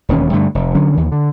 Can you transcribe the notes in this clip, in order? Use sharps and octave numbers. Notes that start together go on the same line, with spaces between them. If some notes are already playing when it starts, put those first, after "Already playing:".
E1 D#2 C#4
G2 D3 A3
F1
D3 F#3 C#4
D#2 E3
D3